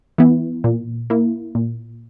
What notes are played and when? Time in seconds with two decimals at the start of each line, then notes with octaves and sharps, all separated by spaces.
0.18 E3 B3 E4
0.64 A#2
1.10 A#3 E4
1.55 A#2